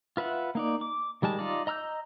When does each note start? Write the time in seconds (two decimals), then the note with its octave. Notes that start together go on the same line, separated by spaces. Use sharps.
0.17 F4 B4 E5 F#5
0.55 A#3 D#4 D5
0.81 D6
1.22 D#3 G3 G#3 A5
1.39 D#4 F4 D5
1.67 D#5 A#5 E6 F6 G6